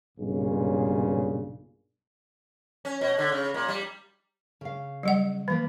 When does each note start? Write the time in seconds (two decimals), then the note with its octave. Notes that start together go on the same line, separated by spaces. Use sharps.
0.18 B1 G2 A#2 C#3
2.85 C#4
3.01 B2
3.18 D3
3.32 C#3
3.54 A#2
3.68 G3
4.61 C#3 F5
5.03 F#3 G3 F#5
5.48 E3 F3 A#3 B4